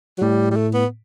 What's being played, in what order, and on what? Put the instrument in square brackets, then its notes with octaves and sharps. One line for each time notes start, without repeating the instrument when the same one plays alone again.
[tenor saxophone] F#3
[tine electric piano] A2 [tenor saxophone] G3
[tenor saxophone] G3
A3
B3